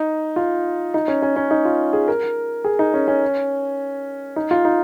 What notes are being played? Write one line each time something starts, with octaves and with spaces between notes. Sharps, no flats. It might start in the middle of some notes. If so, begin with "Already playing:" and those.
Already playing: D#4
F4
D#4
C#4
C#4
C#4
D#4
F4
G#4
A#4
G#4
D#4
C#4
C#4
D#4
F4
D#4